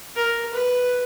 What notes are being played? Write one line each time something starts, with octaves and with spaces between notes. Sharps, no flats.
A#4
B4